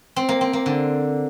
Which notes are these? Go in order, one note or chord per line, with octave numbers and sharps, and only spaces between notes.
C4
A#3
C4
A#3
D3